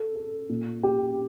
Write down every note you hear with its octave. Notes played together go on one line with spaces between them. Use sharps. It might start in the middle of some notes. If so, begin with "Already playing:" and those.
Already playing: A4
A4
A#2
G4